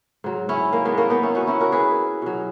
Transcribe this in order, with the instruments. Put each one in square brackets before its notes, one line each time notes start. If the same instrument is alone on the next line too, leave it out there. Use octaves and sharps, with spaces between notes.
[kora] G#2 F#3
C#4 E4
A#3
G#3 B3
A#3 C#4
B3 D#4
C#4 E4
D#4 F#4
C#4 E4
F#4 A#4
G#4 B4
B2 F#3